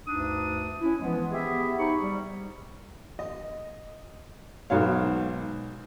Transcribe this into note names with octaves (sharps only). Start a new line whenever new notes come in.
D2 G2 D4 D#4 D#6
C#4 E4
E3 F3 G#3 B3
B3 G4 G#4 E5
D#4 G4 C5 B5 C#6
G3
D#5
B1 G#2 F#4 C#5 F5